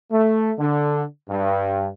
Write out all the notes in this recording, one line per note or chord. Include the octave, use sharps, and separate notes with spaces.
A3
D3
G2